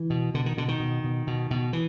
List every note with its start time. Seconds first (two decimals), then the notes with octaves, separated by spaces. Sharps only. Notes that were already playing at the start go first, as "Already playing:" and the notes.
Already playing: E3
0.10 B2
0.34 B2 D3
0.46 D#3
0.57 B2 D3
0.68 D#3
0.80 B2
1.04 B2
1.27 B2
1.51 B2
1.73 E3